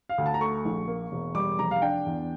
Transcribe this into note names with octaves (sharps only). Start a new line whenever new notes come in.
F5
D2
A5
A#5
A3 C#6
A#1
A#3
E1
G3 D6
F1 A#5
F5
D4 G5
E2